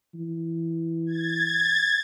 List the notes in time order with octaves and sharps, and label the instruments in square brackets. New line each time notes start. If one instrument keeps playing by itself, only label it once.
[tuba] E3
[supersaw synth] G#6 A6